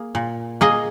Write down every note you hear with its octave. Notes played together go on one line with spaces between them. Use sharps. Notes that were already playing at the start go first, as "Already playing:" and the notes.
Already playing: A#3 G#4
A#2
A#3 G#4 D#5